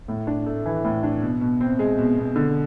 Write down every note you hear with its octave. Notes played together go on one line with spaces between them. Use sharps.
A2
D4
A3
E3
A2
D4
B2
B2
C4
G#3
B2
B2
D3